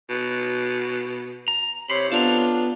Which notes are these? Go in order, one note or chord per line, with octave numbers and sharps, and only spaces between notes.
B2
A#5
C3 C#5 B5 C6
B3 D4 F4 A4 C#5 A#5